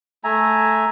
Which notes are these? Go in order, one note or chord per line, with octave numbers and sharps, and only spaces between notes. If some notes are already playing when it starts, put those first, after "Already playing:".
A3 E5 G#5 A#5